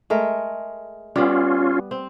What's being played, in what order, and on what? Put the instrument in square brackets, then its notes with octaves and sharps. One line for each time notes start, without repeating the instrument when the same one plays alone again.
[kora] G#3 A3 A#4
[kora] G3 B3 [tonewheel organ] C#4 F4
[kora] C4